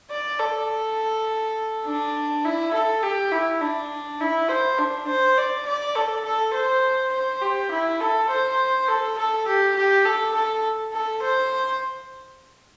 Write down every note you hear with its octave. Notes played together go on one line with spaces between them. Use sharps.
D5
A4
D4
E4
A4
G4
E4
D4
E4
C5
D4
C5
D5
D5
A4
A4
C5
C5
G4
E4
A4
C5
A4
A4
G4
G4
A4
A4
A4
C5